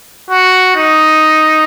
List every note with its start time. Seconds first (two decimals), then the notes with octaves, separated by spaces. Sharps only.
0.30 F#4
0.76 D#4